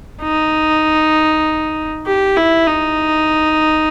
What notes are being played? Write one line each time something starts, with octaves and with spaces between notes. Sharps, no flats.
D#4
G4
E4
D#4